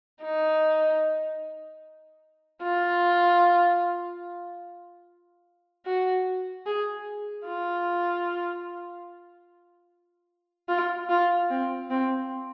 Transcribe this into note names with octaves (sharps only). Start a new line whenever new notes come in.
D#4
F4
F#4
G#4
F4
F4
F4
C4
C4